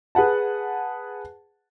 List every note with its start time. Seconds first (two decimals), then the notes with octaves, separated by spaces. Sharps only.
0.15 G#4 B4 F#5 A5